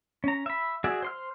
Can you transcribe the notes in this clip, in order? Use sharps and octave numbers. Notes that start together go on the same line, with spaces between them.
C#4 A#5
E5 B5
F#4 G#4 D5 E5
C5 C6 F6